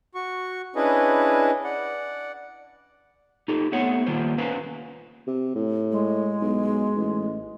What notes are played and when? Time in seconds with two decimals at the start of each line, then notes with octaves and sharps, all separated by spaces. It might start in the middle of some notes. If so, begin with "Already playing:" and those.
0.15 F#4 C#6
0.76 C#4 D4 E4 G#4 B4 D#5
1.64 D5 F#5
3.48 D#4 G4 A4
3.72 A3 B3 C4 C#5 F#5
4.06 D#3 G3 A#3 F4 C5
4.38 C#4 B4 C5 F5
5.27 C3
5.55 A2
5.92 G#3
6.41 B1
6.96 A1